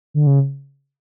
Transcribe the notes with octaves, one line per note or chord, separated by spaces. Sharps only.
D3
C#3